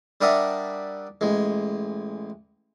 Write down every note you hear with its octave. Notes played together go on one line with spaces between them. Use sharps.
G3 D4 A#4 E5 F#5 D#6
A1 G#3